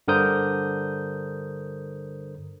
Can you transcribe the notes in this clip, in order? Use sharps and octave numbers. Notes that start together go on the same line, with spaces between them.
G2 D3 A#4 C5 D#6 G6